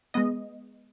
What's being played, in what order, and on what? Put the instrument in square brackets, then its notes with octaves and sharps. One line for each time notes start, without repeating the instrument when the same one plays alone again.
[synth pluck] G#3 B3 D#5